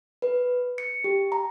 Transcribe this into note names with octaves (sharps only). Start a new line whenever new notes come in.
B4
C#7
G4
A#5